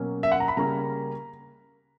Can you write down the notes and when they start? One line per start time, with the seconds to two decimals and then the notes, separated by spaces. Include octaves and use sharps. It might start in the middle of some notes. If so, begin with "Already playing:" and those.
Already playing: B2 F#3 A#3 C#4
0.23 E5
0.32 F#5
0.40 A#5
0.48 B5
0.57 C#3 G3 A#3 C#4 A#5